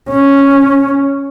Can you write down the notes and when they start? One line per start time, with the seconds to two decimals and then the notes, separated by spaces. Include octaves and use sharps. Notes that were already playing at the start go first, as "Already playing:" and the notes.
0.09 C#4